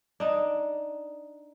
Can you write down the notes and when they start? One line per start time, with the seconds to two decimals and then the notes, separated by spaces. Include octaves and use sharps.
0.20 D4 D#4